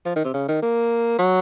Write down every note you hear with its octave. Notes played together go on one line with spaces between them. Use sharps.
F3
D#3
C3
C#3
D#3
A#3
F#3